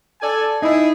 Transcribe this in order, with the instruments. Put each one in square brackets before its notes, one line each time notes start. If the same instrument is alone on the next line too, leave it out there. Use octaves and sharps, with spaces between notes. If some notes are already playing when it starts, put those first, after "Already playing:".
[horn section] A4 D5 G#5
[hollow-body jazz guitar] D#4 [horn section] E4 G#4